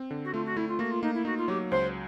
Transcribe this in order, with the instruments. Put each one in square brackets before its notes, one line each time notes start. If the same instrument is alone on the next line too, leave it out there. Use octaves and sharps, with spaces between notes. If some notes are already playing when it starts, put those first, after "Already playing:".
Already playing: [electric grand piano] C4
D3
[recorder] F#4
[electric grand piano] A3 [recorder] F4
[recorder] F#4
[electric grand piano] A3 [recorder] E4
[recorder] F4
[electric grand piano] A#3 [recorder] F#4
[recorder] F4
[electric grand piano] A#3 [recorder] D#4
[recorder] E4
[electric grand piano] D#4 [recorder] F#4
[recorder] F4
[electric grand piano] F#3 [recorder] G4
[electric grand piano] C#2 [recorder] C5